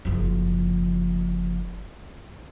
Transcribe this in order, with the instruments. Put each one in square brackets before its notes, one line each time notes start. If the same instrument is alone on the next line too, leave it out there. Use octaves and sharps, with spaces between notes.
[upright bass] F#1 F3